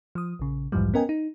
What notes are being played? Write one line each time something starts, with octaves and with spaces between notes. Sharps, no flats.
F3 D#6
A#1 C#3
B1 F2 G#2 E3 F3 G3
B3 C#4 A#4 D#5 G5 G#5
D#4